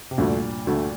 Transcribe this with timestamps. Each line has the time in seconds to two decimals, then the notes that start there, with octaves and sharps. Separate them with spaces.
0.11 C3
0.18 D2 G2 A#2 D3 A3
0.67 D2 D3 A3